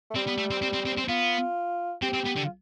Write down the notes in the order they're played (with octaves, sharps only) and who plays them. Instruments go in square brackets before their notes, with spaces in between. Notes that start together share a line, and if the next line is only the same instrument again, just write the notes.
[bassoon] A3
[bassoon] G3 [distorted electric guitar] C4
[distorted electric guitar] B3
A3
C4
C4
C4
C4
C4
[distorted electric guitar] B3 [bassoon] F4
[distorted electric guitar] C4 [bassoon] G4
[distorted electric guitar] C4
B3
D3
[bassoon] F4